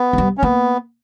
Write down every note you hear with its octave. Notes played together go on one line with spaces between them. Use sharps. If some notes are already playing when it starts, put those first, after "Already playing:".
Already playing: B3
G#3
G3
C#4
A#3 B3